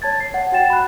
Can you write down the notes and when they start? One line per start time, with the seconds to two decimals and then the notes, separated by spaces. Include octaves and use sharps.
0.02 C#5 A5 G#6 A6
0.20 C7
0.34 C#5 F#5
0.52 F#4 F#5 G5 A6 E7
0.70 B5 F#6